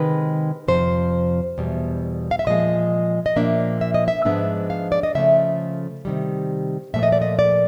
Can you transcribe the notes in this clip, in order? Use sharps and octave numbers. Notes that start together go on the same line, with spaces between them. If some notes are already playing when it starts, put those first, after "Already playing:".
Already playing: C3 D#3 G#3 B4
F2 C3 F3 C5
E2 B2 G3
F5
E5
A#2 F3 G#3 D#5
D#5
A#2 F3 A#3 D4 E5
E5
D#5
E5
G#2 F3 G#3 B3 D4 E5
F5
D5
D#5
C#3 F3 A3 E5
C3 D#3 G3
A#2 F3 A3 E5
D#5
D5
D#5
D5